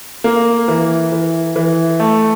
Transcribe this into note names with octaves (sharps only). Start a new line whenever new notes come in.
A#3
E3
E3
E3
A3